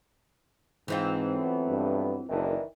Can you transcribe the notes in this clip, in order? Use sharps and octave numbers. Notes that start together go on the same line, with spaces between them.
G#2 E3 C4 F4
F#3 A3 B3
G2
F#1 D#3 E3 D4